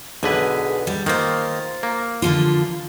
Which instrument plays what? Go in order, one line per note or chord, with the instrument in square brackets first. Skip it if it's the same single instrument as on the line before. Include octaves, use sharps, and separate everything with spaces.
[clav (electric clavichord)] B1 D3 B4 [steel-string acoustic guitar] G#4
[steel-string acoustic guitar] G3
[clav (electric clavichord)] D#3 A#3 [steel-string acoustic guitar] F4 C5
[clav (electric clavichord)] A#3
[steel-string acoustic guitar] D3 F3 F4